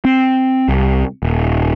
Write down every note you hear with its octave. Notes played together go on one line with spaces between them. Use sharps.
C4
C2
D#1